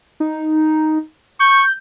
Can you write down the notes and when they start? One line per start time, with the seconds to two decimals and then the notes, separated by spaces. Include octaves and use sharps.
0.20 D#4
1.40 C#6 G6